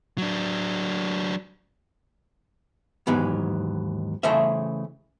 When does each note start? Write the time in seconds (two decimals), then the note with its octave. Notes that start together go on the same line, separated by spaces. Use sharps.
0.18 F#3 D4
3.07 D#2 G#2 E3 F#3 B3
4.23 C#3 E3 A3 C5 D#5 E5